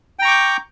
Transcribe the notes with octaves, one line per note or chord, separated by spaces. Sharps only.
G5 A#5 C#6 D6 G6